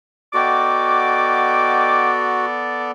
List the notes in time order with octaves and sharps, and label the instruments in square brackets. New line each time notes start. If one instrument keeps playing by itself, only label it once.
[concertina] B3 A4 D5 [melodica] F#4 [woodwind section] D#5 G5 D6